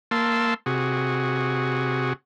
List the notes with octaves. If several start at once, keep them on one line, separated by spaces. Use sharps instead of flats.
A#3 A5 C6 E6
C3 F#4 G#4